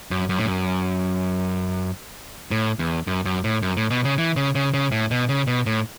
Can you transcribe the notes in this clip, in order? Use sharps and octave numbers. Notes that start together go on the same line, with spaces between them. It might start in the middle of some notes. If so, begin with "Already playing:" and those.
F#2
F#2
A2
F#2
A2
E2
F#2
F#2
A2
F#2
A2
B2
C#3
E3
C#3
C#3
C#3
A2
B2
C#3
B2
A2